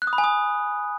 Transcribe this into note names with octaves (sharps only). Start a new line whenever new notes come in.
F#6
D#6
B5
G#5
D#6